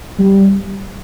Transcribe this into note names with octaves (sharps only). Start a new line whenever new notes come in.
G3